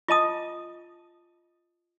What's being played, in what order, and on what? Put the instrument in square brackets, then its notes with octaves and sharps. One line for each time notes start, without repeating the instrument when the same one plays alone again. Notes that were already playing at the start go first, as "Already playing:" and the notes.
[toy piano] F4 D#5 A5 D#6